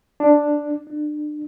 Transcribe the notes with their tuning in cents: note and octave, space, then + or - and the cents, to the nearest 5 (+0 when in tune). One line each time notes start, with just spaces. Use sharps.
D4 +5
D4 +35